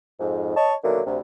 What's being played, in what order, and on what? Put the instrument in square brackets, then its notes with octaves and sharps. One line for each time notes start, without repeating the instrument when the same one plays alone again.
[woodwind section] F2 G#2
C#5 D#5 A5
B2 D3 D#3 F#3 A3 A#3
D2 C3